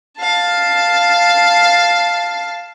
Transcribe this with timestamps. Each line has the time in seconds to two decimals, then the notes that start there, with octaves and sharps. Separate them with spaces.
0.18 F5 A5